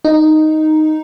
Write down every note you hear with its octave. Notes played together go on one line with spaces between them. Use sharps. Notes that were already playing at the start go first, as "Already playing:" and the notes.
D#4